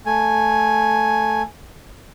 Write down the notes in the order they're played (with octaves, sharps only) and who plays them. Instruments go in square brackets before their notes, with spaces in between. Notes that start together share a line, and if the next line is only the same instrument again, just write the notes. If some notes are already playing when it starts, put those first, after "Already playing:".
[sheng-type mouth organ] A3 G#5